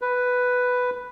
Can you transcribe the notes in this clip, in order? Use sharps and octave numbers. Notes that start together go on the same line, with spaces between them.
B4